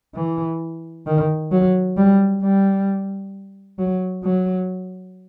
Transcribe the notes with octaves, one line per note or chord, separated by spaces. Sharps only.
E3
D#3
F#3
G3
G3
F#3
F#3